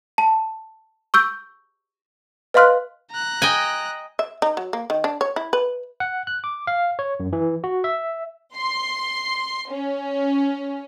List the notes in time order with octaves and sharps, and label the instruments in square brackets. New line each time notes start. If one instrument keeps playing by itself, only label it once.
[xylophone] A5
C#6 E6 G6
B4 D#5 F5 C6 F6 F#6
[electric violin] A#5 F#6
[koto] D#5 G5 G#5
[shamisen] E5
D#4
F#3
A#3
D#3
D4
C#5
E4
B4
[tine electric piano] F#5
F#6
D6
F5
C#5
F#2
E3
F#4
E5
[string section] C6
C#4